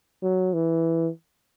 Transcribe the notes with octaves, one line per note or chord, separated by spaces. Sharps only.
F#3
E3